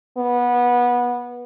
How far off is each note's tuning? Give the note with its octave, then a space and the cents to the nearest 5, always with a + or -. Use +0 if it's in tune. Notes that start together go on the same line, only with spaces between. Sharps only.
B3 -20